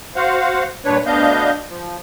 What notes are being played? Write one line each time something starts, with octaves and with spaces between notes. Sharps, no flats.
F#4 C5 F5 F#5
G2 A#2 D4 B4 C#5
D2 B3 D4 D#5 F5 G6
F3